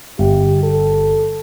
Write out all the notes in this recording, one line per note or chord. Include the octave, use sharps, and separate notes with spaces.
G1 G4
A4